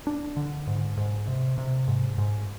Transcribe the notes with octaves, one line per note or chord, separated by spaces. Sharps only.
D4
D3
G#2
G#2
C3
C3
G#2
G#2